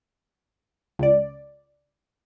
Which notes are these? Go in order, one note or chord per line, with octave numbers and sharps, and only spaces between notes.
C#2 D5